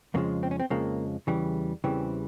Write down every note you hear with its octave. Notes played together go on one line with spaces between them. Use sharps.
F2 C#3 F3 G#3 A#3
C4
C#4
C4
F2 C#3 F3 G#3 A#3
E2 C#3 E3 G3
E2 C#3 E3 G3 C4